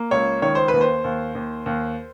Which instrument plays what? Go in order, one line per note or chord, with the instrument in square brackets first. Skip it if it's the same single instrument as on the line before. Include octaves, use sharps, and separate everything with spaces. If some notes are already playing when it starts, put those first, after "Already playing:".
Already playing: [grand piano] A#3
C#2 C#5
D#3 C#5
C5
B4
D#2
C5
D#2
D#2
D#2